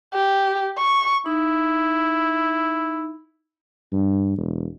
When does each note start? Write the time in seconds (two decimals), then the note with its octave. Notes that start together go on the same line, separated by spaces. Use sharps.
0.14 G4
0.78 C#6
1.26 D#4 E4
3.92 G2
4.37 E1